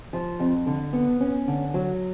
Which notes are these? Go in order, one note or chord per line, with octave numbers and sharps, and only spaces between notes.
F3
F2
D3
B3
C#4
D3
F#3